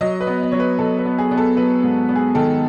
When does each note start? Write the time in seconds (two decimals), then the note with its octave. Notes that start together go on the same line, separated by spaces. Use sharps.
0.01 F#3 D#5
0.21 B4
0.27 B3
0.43 D#5
0.52 F#3 C#5
0.60 B4
0.79 F#3 A4
0.99 B4
1.05 B3
1.18 G#4
1.31 B3
1.38 A4
1.57 F#3 B4
1.83 G#2
2.09 B3
2.16 G#4
2.35 D#3 A4